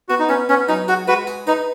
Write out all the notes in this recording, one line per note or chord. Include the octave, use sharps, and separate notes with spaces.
B3 F#4
D#4
B3 C#4
B3 C#4
F#3 D#4
F#4 G#4
G#3 F#4 B4
G#4
D#4 B4